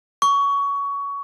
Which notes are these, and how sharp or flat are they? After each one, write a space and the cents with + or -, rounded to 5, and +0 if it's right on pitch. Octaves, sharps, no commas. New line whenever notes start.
C#6 +20